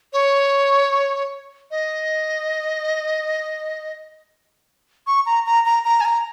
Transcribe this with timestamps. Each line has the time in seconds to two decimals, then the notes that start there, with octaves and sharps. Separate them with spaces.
0.13 C#5
1.71 D#5
5.07 C#6
5.26 A#5
5.46 A#5
5.65 A#5
5.85 A#5
6.01 G#5
6.05 A#5